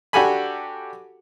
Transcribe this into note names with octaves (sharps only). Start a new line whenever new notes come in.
D4 F#4 G4 A4 G#5 B5